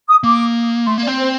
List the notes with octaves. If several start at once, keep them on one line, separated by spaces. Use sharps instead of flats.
D#6
A#3 D6
A3 C6
A#3
D5
C4
C5